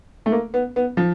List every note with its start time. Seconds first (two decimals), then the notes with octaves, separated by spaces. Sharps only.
0.26 A3
0.32 A#3
0.54 B3
0.76 B3
0.97 F3